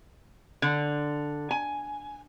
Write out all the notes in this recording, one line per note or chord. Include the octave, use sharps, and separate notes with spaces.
D3
G#5